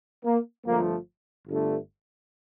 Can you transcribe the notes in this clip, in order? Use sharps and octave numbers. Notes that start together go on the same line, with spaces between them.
A#3
G1 G2 F3 A3 A#3
G1 G2 D3 A3